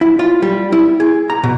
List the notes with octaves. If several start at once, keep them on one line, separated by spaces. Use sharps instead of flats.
E4
F4
G3
E4
G#4
A#5
B2